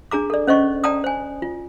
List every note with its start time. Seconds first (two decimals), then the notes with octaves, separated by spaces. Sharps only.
0.11 D4 G#4 A#5 D6
0.30 A4 D5
0.47 C#4 C5 D#5 C#6
0.84 D5 G5 A5 A#5 D#6
1.04 C5 G#5
1.42 F4